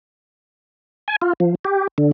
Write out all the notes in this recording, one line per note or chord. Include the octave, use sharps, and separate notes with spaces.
G#5
F4
F3
G4
D3